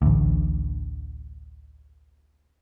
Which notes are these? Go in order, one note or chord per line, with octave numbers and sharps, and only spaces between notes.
A1 D2